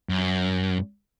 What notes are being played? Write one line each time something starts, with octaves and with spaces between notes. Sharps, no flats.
F#2